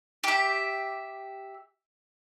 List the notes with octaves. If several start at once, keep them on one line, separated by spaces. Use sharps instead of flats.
G4 E5